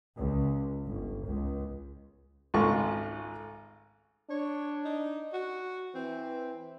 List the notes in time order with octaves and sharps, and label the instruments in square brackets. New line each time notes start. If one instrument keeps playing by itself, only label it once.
[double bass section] C#2
G1
C#2
[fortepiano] G#1 C#2 A3 F4 C#6
[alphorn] D4 [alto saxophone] C#5
[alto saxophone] D#4
F#4
[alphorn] E3 [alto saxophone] C4